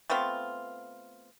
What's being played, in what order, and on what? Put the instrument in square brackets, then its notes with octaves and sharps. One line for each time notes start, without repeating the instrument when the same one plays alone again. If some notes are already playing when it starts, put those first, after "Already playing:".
[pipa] A3 B3 C4 F4